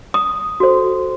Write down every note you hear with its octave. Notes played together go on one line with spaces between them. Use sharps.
D#6
F#4 A4 C5